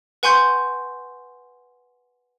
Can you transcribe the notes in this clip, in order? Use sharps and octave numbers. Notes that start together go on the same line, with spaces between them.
B4 F#5 G#5 C6 C#6 G6